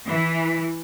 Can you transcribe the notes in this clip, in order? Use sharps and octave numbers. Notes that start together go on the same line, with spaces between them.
E3